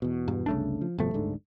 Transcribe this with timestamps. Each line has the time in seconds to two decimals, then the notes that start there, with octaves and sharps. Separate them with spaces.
0.02 E2 B2
0.28 G2
0.46 F#1 C2 C#3 A3 D4
0.81 F3
0.98 G1 F2 B2 F3 A3
1.14 D1 G#2 D3